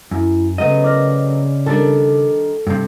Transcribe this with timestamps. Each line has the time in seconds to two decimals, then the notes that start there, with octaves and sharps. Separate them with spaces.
0.11 F#2 E4
0.58 C#3 F#3 A3 B3 D#5
0.84 D5 F6 A#6
1.66 D#3 G3 D4 A4 A6 C#7
2.67 G2 C3